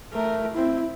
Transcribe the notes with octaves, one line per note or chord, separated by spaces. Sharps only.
A3 A#4
C4 E4